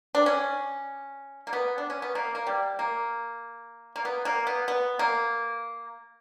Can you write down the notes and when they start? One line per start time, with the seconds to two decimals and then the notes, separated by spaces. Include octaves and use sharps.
0.15 D4
0.26 C#4
1.47 A#3
1.53 B3
1.78 D4
1.90 C#4
2.02 B3
2.15 A#3
2.35 A#3
2.47 G3
2.79 A#3
3.96 A#3
4.05 B3
4.25 A#3
4.47 B3
4.68 B3
4.99 A#3